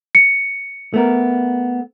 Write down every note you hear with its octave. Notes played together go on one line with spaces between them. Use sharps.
C#7
A3 B3 A#4